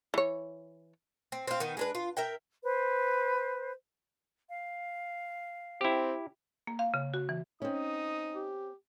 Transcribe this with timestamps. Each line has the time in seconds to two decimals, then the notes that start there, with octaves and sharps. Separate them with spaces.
0.14 E3 C#5
1.32 C4
1.48 C4 F4
1.60 D#3 B3
1.77 G#3 D4 B4
1.95 F4
2.17 A#4 E5 G5
2.64 B4 C5
4.49 F5
5.81 C4 E4 G4
6.67 A#3
6.79 F5
6.94 C#3
7.14 F#4
7.29 E3
7.62 C4 C#4 D#4 D#6
8.35 G4